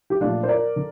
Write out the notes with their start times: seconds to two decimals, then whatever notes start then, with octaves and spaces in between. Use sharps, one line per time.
0.10 G4
0.21 A#2 F3 A3 D4 F4
0.43 C5
0.48 A#4 D5
0.76 D3